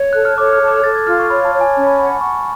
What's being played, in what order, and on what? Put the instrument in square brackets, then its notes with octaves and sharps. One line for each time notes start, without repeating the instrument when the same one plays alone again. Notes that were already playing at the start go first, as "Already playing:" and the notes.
Already playing: [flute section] C#5
[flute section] A4 [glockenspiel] F#6
[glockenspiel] F6
[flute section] C#5 [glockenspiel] D6
[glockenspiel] F6
[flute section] A4
[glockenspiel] D6
[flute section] A4 [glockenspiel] A6
[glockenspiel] G#6
[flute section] F4 [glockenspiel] F6
[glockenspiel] C#6
[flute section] C#5 [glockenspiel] B5
[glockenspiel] A5
[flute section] C#5
[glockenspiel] G#5
[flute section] C#4 [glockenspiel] A5
[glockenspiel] B5
[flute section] F#5 [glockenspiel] B5
[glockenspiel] B5
[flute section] F#5 [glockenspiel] C#6